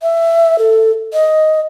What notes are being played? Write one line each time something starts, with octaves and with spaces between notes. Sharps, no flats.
E5
A4
D#5